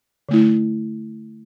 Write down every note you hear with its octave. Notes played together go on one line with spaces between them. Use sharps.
D3 A3 E4